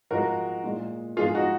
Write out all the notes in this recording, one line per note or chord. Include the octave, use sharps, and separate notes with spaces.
G#2 F3 G#3 F#4 A#4
A#2 G#3
G#2 F3 G#3 F4 G#4
D#4 F#4